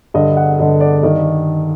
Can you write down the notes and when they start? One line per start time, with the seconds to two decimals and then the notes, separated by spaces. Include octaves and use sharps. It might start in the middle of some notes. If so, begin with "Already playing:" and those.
0.14 G2 D3 D#5
0.37 F#5
0.59 G2 D3 D#5
0.80 D5
1.03 G2 D#3 D#5